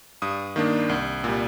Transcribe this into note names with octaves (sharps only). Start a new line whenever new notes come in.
G2 D#6
D#3 A#3 D4
C2
A#2 G3